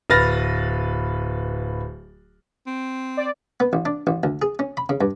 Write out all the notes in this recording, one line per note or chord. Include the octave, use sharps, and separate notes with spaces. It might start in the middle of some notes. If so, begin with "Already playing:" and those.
D1 B4 F6 A6 A#6
C4
D5
B3
A1
D4
A1
D2
G#4
C#4
B5
C#3
G2